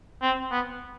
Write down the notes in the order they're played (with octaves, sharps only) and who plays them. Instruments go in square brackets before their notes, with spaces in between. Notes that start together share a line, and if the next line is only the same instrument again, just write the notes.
[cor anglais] C4
B3